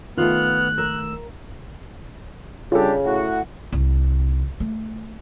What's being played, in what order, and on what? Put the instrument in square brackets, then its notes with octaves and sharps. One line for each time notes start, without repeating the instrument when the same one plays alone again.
[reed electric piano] D#3 A3 [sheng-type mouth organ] B3 F6 [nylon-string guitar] F4 [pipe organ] F#6
[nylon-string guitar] A#4 [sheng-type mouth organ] E6
[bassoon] C#3 [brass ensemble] G3 D4 G4 [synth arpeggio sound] F4 A4
[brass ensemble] A2 F#4
[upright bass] C2
A3